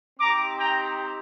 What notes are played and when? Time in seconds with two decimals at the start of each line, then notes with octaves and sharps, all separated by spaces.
0.20 C4 D#4 G4 A#5 D6
0.59 G5 A#5